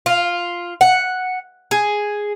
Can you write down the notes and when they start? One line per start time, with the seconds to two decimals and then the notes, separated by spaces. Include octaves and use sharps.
0.06 F4
0.81 F#5
1.71 G#4